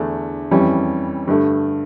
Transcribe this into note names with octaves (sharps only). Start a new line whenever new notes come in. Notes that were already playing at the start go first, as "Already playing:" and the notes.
Already playing: E2 D3 A3 D4
F2 E3 G3 C#4
G2 D3 A3